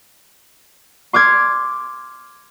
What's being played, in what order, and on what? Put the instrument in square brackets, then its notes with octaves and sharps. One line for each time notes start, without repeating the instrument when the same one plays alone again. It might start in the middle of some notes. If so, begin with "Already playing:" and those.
[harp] C6 D6 F6 G#6